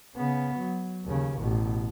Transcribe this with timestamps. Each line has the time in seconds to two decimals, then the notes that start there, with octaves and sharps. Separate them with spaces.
0.16 C#3 B3
0.59 F#3
1.05 D#2 C#3
1.39 A1 B2